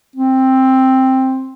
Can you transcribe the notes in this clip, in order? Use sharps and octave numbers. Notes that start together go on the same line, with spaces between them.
C4